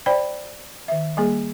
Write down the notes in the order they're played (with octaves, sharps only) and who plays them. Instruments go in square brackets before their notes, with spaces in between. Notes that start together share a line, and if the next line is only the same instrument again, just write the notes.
[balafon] C5 D5 G5 B5
D#3 E5
G3 A#3 G#4